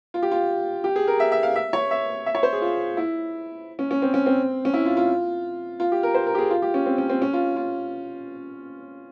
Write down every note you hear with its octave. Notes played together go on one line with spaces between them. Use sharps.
F4
G4
F4
G4
G#4
A#4
E5
E5
F5
E5
C#5
E5
E5
C#5
C5
G#4
F4
E4
C#4
C#4
C4
C#4
C4
C#4
E4
F4
F4
F4
G4
A#4
C5
A#4
G4
G#4
F4
G4
C#4
C4
C#4
C4
C#4
F4
F4